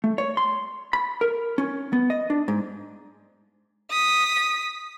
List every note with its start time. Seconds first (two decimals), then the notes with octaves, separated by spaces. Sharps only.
0.04 A3
0.18 C#5
0.37 C6
0.93 B5
1.21 A#4
1.58 C#4
1.93 B3
2.10 D#5
2.30 D4
2.48 G#2
3.91 D#6 B6